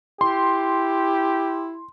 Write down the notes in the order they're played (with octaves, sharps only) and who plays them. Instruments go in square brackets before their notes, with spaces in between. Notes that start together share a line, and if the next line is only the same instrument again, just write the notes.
[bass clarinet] E4 [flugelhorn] G4 [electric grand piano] C6